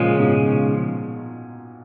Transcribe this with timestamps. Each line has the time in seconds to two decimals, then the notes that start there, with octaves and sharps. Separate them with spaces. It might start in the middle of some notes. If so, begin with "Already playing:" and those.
Already playing: A#2 C#3 F3 G#3
0.19 G#2 B2